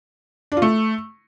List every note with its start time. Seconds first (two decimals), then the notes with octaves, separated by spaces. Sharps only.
0.52 D4
0.57 F4
0.62 A3